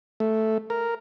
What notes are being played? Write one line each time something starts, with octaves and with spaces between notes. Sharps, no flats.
A3
A#4